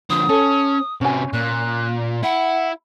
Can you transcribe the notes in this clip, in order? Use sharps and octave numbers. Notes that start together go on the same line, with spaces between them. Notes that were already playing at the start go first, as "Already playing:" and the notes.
D3 F3 D#6
C#4 A4
C3 C#4 F#4 G#5
A#2 F#6
E4 F#5